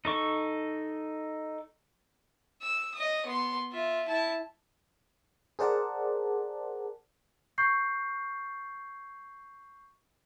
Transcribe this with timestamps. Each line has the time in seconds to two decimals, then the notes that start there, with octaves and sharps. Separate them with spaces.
0.05 D#4 A4 C#6
2.62 E6
2.95 D#5 D#6
3.26 B3 C6
3.72 F4 E5
4.08 E4 A5
5.59 G#4 A#4 C5 D5 F#5 A5
7.58 C#6 G6 C7